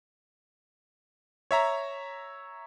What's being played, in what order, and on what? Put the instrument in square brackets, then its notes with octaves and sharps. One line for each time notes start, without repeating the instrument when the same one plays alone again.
[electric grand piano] C#5 E5 A#5